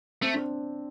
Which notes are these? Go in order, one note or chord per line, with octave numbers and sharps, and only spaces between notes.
A3 C4
D4